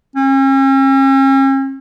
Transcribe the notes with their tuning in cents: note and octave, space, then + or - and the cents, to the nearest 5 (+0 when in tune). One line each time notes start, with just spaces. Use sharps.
C#4 -45